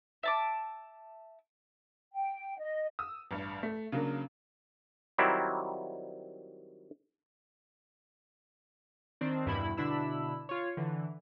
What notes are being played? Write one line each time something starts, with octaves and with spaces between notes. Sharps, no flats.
E5 A5 D6
G5
D#5
D#6 E6
A1 G2
A3
C#3 F#3 A#3 D4
D#3 F#3 G3 C4 E4
D#3 C4 D4
E2 G2 B2 E4 B5
B2 D3 D4 E4 B5 E6
F4 C#5
D3 E3